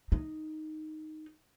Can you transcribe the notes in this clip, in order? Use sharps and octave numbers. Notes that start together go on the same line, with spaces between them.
D#4